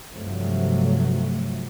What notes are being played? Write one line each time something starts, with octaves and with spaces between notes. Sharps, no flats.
G2 C3 F3 F#3 A3